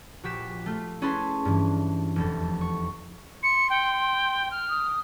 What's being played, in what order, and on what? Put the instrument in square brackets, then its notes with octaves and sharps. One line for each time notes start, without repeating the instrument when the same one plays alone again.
[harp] A#1 F#4 G4 B6 E7
A3 F4
C#4 E4 G#4 B4 A5 C6
G2 E3
F1 E2 A4
C#6
[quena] C6 [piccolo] C#7
[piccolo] G5
F6
[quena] D#6